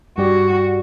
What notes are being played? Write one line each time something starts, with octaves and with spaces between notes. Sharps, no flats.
G2 F#4 G4 D5